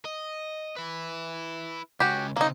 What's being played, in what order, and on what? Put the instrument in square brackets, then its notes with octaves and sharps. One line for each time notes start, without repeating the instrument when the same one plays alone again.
[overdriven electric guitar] D#5
E4 B4
[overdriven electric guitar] C#2 C#4 [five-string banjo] F#4 G4
[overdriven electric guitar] C#3 C4 [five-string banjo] A#3 D#4